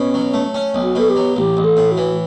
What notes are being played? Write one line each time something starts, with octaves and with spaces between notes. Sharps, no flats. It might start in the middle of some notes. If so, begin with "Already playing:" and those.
Already playing: B2 C#4
F#3
A3
C#4
B1
F#4
B2 A4
G4
F#3
A1 G4
A1
A4
A2
F#4
E3